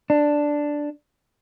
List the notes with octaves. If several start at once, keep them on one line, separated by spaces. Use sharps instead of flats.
D4